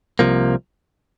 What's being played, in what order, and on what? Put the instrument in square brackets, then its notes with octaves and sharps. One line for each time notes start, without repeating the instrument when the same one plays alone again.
[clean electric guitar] C2 C3 F3 A#3